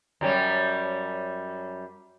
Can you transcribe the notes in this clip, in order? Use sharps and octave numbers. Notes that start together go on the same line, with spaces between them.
F#2 G3 C#4